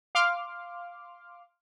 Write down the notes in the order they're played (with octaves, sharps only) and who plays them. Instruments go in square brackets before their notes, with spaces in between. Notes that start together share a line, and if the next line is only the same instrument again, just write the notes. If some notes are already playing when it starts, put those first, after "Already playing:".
[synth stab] F5 C6 D6 F6